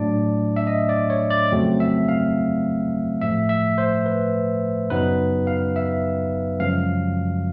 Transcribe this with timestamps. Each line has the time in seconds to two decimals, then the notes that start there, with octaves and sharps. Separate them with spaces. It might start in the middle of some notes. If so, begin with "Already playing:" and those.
Already playing: A2 F#3 A3 D4 D5
0.56 E5
0.67 D#5
0.89 D5
1.10 C#5
1.31 D5
1.52 F2 C#3 F#3 A3 C4
1.80 E5
2.08 F5
3.21 A2 F3 A3 E5
3.49 E5
3.78 C5
4.06 B4
4.90 F#2 C#3 F#3 B3 D#4 B4
5.47 F5
5.76 E5
6.60 F#2 C#3 F3 G#3 F5